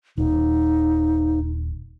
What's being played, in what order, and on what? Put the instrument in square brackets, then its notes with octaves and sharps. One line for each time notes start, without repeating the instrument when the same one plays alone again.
[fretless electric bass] D#1 [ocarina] D#4